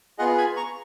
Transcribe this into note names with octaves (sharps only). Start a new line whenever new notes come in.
B3 F4 G#4 D#5 F#5
G#5 B5
A#5 C#6